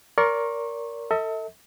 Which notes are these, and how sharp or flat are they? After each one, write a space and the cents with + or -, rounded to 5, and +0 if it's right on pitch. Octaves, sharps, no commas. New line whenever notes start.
A#4 +0 D5 -35 C#6 -40
A4 +30 E5 -45